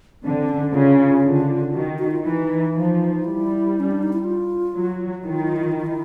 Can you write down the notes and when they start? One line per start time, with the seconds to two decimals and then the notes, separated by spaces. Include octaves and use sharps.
0.23 D3 C4
0.49 C#4
0.73 C#3 F4
1.24 D3
1.74 D#3 F#4
1.99 F#4
2.12 F4
2.23 E3 D#4
2.74 F3
3.24 G3 E4
3.80 C#4
3.91 D4
4.03 D#4
4.13 E4
4.24 F4
4.74 F#3
5.24 D#3 E4
5.32 F4
5.40 E4
5.47 F4
5.56 E4
5.63 F4
5.72 E4
5.80 F4
5.86 E4